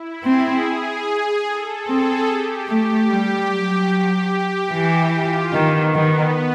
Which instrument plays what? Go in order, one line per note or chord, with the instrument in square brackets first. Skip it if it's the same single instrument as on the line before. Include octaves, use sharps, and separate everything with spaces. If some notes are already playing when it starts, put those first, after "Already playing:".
Already playing: [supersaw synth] E4
[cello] C4 [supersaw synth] G#4
[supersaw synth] A4
[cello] C4 [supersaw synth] G#4
[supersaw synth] G4
[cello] A3 [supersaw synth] G4
[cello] G3
F#3
[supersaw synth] G4
[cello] E3
[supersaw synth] F4
[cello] D#3 [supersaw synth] B3
[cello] D#3